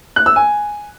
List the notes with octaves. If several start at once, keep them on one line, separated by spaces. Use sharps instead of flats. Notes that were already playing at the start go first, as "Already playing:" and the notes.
F#6
E6
G#5